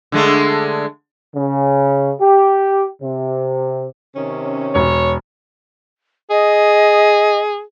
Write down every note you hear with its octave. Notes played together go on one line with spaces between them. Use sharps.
D3 G#3 A3
C#3
G4
C3
C3 D#3 C#4
E1 C#5
G#4 D#5